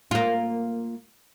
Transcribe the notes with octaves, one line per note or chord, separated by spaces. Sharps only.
A#3 F4